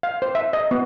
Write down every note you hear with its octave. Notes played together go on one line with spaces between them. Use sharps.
F5
C5
E5
D#5
B3